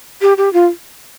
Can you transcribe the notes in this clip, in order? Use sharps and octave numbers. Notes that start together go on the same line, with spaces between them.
G4
G4
F4